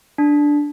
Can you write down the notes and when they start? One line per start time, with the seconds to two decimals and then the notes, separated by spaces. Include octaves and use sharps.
0.18 D4